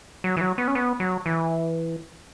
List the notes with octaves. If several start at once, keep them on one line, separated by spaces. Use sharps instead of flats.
F#3
E3
F#3
B3
C#4
B3
F#3
E3